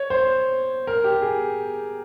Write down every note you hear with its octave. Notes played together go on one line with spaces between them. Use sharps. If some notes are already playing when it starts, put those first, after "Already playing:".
Already playing: C#5
C5
A#4
G4
G#4